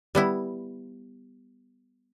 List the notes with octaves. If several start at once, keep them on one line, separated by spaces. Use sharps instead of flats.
G3 B3 E4